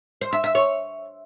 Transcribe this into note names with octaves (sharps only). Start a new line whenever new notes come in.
C5
E5
E5
C#5